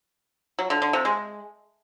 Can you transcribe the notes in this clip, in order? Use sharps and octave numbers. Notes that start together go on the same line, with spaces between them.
F#3
D3
D3
C3
G#3